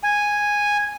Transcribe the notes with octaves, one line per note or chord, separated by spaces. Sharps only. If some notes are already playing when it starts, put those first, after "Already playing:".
G#5